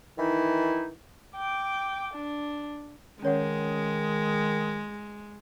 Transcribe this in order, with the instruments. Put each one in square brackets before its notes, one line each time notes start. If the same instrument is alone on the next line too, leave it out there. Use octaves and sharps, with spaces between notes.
[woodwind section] D#3 E3 D#4 E4
[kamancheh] G5 D6
D4
[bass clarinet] D#3 [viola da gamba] G#3 [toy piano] C#4 C#5 F#5